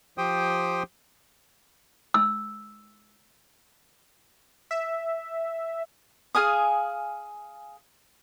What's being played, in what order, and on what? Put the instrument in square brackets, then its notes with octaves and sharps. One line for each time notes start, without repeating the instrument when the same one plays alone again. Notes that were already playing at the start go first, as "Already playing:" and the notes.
[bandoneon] F3 G4 C5 G5 D#6
[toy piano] E6
[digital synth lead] E5
[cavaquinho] G#4 F5 G#5 D#6